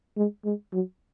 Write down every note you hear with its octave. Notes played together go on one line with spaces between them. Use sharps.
G#3
G#3
F#3